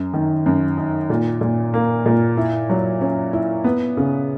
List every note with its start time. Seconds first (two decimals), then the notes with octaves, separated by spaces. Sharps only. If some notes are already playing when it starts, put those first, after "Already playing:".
Already playing: F#2
0.13 D#3
0.46 F#2
0.78 D#4
1.10 A#2
1.41 A#2
1.74 A#3
2.06 A#2
2.37 E4
2.70 F#3
3.01 C#4
3.33 E4
3.64 B3
3.97 C#3